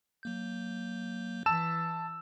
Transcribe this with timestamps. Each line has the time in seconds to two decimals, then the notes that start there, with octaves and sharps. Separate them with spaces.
0.23 F#3 A#3 G6
1.46 E3 A5 E6 E7